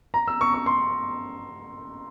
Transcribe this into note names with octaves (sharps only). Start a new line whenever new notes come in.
A#5
E6
C#6
C#6
C6